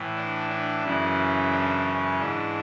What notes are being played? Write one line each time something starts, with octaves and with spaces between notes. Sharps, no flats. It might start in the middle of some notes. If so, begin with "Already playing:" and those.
Already playing: A2 E3
D4
D4
F#2 C#3 E3 E4
D4
C#4
G#2 E3 D4